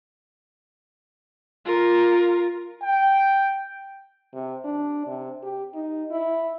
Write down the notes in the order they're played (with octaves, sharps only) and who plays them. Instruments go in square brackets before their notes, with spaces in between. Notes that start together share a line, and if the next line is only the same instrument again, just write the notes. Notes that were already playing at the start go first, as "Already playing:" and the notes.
[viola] F4 A#4
[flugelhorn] G5
[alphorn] C3
D4
C3
G4
D#4
E4